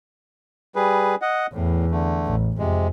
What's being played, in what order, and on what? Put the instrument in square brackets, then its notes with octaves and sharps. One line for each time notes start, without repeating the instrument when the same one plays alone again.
[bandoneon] G3 G#4 B4
D#5 F#5
[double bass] E2 [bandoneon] A2
[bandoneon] D3 A3
[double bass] A1
[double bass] F2 [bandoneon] C3 G#3